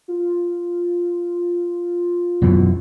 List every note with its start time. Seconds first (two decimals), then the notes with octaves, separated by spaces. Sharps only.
0.08 F4
2.42 F#2 B2 E3